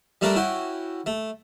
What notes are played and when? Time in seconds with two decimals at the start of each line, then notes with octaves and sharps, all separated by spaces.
0.21 G3 A3 D4 A#4 D5 E5
0.36 C#4 E4 F#4 G5
1.06 A3